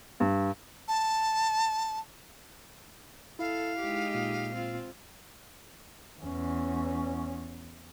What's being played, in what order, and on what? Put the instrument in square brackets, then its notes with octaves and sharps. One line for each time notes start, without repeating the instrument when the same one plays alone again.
[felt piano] G2
[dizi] A5
[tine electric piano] E4 [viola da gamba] A4 [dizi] F5
[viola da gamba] G#3 D#4 G4
[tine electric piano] A#2
[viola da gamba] C4 F4
[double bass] E2 C#4